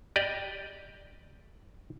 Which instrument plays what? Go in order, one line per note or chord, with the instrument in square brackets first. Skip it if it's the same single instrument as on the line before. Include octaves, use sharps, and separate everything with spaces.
[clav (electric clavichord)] G4 D5 D#5